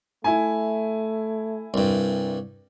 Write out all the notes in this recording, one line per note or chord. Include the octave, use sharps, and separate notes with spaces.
A3 E4 E5 G#5
C2 G2